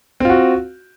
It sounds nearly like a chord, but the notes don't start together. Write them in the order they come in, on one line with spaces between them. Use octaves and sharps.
C4 F4 F#4